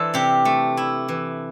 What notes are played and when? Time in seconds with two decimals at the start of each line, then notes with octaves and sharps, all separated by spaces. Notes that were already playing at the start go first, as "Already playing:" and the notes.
Already playing: E3 D4 A4 C5
0.14 C3 G4
0.45 A3
0.77 E4
1.08 E3